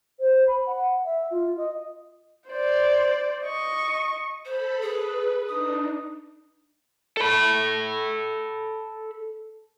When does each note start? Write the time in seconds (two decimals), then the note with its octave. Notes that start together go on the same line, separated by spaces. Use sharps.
0.19 C5
0.47 B5
0.66 F#5
1.04 E5
1.30 F4
1.57 D#5
2.50 C5 D5
3.45 D#5 C#6
4.45 A4 C5 B5
4.81 G#4 B4
5.48 D4 D#4 D#6
7.17 A4 B5